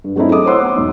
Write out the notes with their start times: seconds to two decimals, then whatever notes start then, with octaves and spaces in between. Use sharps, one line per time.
0.04 G2
0.16 F#3 G#3 A3 C4 D#4 E4
0.32 D#5 D6 D#6
0.46 C5 C#5 F#5 C6 D6 E6
0.62 B3
0.76 E1 D#4